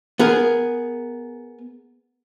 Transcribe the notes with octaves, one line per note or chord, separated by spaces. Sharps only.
B3 G#4 A#4